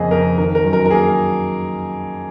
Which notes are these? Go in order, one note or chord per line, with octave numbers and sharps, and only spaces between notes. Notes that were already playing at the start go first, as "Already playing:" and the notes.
Already playing: F2 C#3 A#3 G#4 D#5
F2 A#4
D#3 A#4
A#4
F#2
A#4
A#4
A#3 G#4